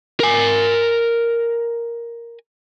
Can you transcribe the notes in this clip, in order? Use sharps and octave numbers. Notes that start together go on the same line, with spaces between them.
A#4 G#5